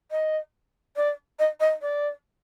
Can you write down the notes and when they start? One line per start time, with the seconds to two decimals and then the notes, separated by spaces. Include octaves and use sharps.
0.11 D#5
0.96 D5
1.39 D#5
1.60 D#5
1.82 D5